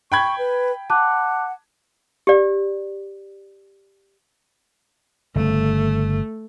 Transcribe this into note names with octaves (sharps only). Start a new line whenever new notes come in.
G5 B5 C#6 G#6
B4
F#5 A5 D6 F#6
G4 D5
G1 C#3 A3